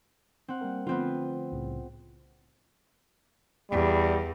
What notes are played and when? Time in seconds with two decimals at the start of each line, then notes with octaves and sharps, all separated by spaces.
0.48 C4 F#5
0.61 G3 A#3 A#4
0.87 D3 F3 A3 B3 C4 F4
1.52 C2 A2 C#3
3.71 E2 G3